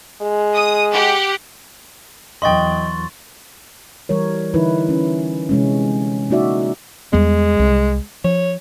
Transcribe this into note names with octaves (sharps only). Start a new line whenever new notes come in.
G#3
D#6
G4 F#5
E2 F#3 D#5 G5 C6 C#6 A6
E3 G3 A#4 C#5
D3 E3 D#4 E4 B4
C#4
C3 G#3 C#4
A#3 D#4 F#4 D5 E5
E2 G3 G#3 B3
C2
F3 C#5